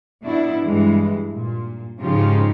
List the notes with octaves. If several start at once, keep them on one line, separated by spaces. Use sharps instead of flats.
B2 D4 E4
G2 E3 G#3
A#2
G#2 C#3 F3 D#4 F4 G4